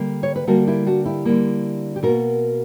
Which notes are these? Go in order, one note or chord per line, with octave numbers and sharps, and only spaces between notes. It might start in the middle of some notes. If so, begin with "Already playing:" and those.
Already playing: D3 G3 A#3
C#5
B4
D3 G3 A#3 F#4 A#4
E4 G4
D4 F#4
E4 G4
D3 G3 A#3
G4
B2 A#3 F#4 A#4